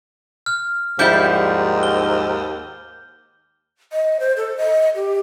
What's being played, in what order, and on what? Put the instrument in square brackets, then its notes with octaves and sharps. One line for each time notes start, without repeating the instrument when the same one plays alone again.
[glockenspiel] F6
[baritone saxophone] D#2 [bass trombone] G#2 [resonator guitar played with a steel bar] F3 G3 E4 [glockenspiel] D6 G6
[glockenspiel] G7
[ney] D#5
C5
A4
D#5
G4